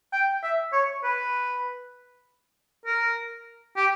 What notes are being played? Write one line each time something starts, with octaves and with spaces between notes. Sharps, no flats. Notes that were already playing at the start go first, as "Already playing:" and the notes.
G5
E5
C#5
B4
A#4
G4